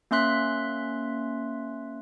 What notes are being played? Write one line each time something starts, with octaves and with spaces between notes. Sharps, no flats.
A#3 C#4 E5 C6 F#6 B6